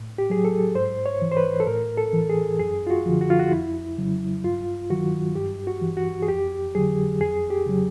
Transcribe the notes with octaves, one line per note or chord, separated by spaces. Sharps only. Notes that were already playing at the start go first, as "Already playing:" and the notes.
Already playing: A2
G4
F#3 G#4
A4
G#2 C5
C#5
E3
C5
B4
A4
A2 A#4
A4
E3
G#4
F#2 G#4
F4
F#4
D3 F3
F#4
F4
F#4
F2 E4
C#3 F#3
G2 F4
D#3 F#3 F#4
G2 G4
F#4
E3
F#4
G#4
F2 G4
D3 F#3 G#4
F2 G#4
G4
C#3 F#3